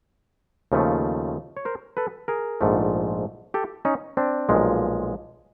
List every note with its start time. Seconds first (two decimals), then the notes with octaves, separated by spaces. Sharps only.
0.72 D#2 C#3 F3 A3
1.57 C#5
1.65 A#4 C5
1.97 A4 B4
2.28 G#4 A#4
2.61 A#1 G#2 F3 A3
3.54 G4 A4
3.85 C#4 D#4
4.17 C4 D4
4.49 B1 A#2 F3 G#3